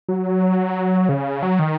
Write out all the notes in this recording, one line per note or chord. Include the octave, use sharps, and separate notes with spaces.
F#3
C#3
F#3
D#3